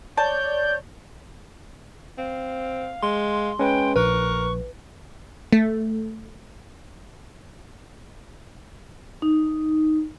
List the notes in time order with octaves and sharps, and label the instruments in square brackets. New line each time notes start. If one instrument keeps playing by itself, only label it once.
[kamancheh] C#5 [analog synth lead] D5 [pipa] A5 [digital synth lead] G6
[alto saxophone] C4 [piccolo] F5
[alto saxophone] G#3 [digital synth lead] C6
[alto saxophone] G#3 [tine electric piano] C#4 B4 [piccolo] G5
[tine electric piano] A#1 [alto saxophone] A#4 [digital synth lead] B4 [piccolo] C#6
[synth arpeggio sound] A3
[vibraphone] D#4